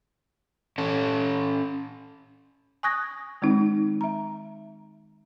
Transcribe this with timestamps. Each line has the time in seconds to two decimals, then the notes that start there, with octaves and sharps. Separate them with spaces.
0.78 C#4 A4
2.83 G#5 C#6 D#6 F#6 G#6 A#6
3.42 D#3 G#3 C4 D#4
4.01 E5 A#5